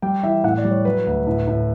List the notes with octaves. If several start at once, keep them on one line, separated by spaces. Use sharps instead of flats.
G3 G5
E3 E5
A2 F#5
D5
G3
C#5
F#3 B4
D2
A2
A2